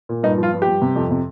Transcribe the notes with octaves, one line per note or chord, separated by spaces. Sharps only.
A#2
G2 D#4
F3
F4
G2
G4
G2
C3
F2
C3